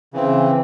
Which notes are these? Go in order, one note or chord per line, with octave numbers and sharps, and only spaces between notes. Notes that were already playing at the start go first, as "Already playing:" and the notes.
C#3 E3 C4